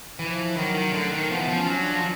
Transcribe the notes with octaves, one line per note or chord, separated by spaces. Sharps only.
E3 F3
D#3 F#3
D#3
D3 A3
D#3
F3 B3
E3
F3
C#4
F#3
D4
F3